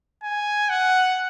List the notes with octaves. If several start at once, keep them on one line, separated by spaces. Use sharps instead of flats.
G#5
F#5